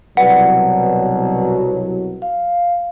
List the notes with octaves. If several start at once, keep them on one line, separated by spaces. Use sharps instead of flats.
C2 B2 F#3 B4 D5 F#5
F5